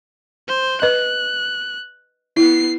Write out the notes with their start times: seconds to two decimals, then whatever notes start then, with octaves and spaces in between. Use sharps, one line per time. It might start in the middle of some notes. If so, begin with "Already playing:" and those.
0.48 C5
0.82 B4 D#5 F#6
2.37 B3 E4 C7